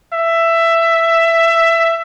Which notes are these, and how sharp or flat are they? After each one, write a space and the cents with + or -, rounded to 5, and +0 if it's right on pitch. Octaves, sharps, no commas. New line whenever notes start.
E5 +15